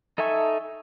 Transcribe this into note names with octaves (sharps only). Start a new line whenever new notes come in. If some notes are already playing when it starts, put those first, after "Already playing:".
D#4 A4 E5 G#5 C#6